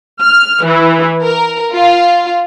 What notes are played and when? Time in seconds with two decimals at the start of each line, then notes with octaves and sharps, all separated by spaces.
0.21 F6
0.64 E3
1.23 A#4
1.74 F4